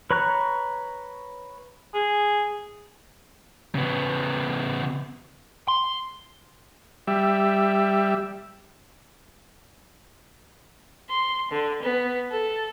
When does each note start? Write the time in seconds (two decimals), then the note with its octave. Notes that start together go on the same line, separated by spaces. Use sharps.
0.11 B4 C#5 A#5 C#6 F#6
1.95 G#4
3.75 C#3 B3
5.68 C6
7.07 G3 E5
11.11 C6
11.52 D3
11.82 B3
12.30 A4